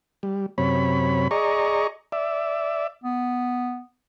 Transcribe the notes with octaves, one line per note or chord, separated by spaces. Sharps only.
G3
F#2 C3 C#5 B5
G#4 D5 D#5 A#5 C#6
D5 E5
B3